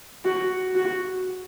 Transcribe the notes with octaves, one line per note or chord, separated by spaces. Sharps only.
F#4
F#4